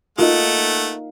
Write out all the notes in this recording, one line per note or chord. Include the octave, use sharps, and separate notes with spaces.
A3 A#3 D#4 F4 F#4 D#5 F#5